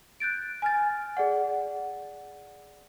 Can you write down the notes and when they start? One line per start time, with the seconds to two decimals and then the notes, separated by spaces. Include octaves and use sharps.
0.20 F#6 G6 A6 D7
0.62 G#5 F6 A6
1.17 G#4 D5 F#5